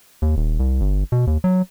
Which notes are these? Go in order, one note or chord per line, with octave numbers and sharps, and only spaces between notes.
D#2
D#1
C2
G1
B2
D#2
F#3